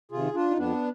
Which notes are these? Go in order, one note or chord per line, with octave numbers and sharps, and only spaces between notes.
C3 D#3 F4 G#4
D4 F4
D#4
F2 B3 D4